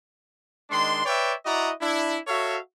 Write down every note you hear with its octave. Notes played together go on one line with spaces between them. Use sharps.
D#3 G#3 D4 C6
B4 C#5 D5 E5 G5
E4 F#4 D5 D#5 A#5
D4 E4
F#4 A4 C#5 E5 F5